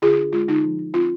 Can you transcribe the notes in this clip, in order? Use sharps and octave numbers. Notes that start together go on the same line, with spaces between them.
D3 F4 G#4
D4
G#3 F4
D3 D#4
F3
D#4
C4 F4